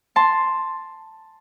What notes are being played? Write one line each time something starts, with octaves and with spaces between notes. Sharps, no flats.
A5 C6